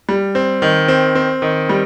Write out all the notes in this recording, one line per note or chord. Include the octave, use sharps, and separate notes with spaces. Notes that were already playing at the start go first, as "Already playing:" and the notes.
G3
C4
D#3
C4
C4
D#3
G3